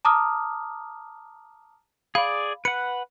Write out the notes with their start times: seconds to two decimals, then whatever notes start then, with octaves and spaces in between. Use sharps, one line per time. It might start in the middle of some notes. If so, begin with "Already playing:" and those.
0.05 A5 A#5 D6 D#6 F6
2.15 G#4 D5 F5 B5
2.65 B4 F#5 C#7